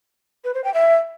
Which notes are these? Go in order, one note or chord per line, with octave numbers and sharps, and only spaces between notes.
B4
C5
G5
E5